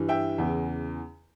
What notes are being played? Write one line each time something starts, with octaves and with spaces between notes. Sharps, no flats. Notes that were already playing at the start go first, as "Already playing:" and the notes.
Already playing: G2 E3
E5 G5
E2 C#3 E3